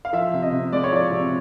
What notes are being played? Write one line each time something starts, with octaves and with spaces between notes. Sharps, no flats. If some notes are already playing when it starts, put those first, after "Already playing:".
F5
F3 E5
C3
D#5
C3
G#3 D5
C#5
F3 D5
C3